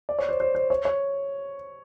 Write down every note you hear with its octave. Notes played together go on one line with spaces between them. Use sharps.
D5
C#5
C5
C5
C5
C#5
C#5